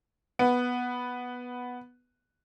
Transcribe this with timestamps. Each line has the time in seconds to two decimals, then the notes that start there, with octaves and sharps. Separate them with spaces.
0.39 B3